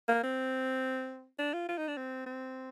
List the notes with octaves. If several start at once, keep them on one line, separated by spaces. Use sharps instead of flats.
A#3
C4
D4
F4
F4
D#4
D4
C4
C4